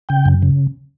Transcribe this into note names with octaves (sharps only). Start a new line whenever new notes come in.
C#3 G5
F#2
C#3